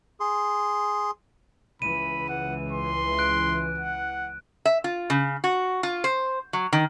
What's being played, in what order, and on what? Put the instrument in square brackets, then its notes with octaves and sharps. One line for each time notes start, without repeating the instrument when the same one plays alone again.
[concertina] G#4 C6
[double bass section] C#2 E3 [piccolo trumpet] B5 [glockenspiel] D#7
[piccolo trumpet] F#5
C6
[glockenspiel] F#6 D7
[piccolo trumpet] F#5
[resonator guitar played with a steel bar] E5
F4
C#3
F#4
F4
C5
F#3
D#3